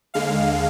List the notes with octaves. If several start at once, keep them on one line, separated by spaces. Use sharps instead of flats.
D#2 D3 G#3 F5